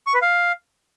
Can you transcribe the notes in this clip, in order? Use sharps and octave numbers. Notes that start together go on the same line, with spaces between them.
C#6
B4
F5